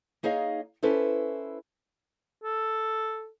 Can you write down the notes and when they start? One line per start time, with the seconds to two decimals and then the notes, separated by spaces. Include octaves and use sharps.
0.23 A#3 D#4 G#4 C#5 D#5 F5
0.83 C#4 E4 A4 B4 C5
2.44 A4